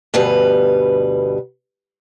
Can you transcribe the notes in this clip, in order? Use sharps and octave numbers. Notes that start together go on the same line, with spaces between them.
D2 G2 B2 G3 B4